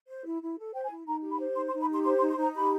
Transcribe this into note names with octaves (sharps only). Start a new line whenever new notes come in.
C5
E4
E4
A4
C5 G5
G#5
E4
D#4 A#5
G4
B5
C5
D#4 C6
C6
D#4
B5
G4 C6
C5 C6
C6
D#4
C6
D#4 A#5
G4 B5